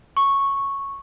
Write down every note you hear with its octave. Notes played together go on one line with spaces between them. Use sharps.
C#6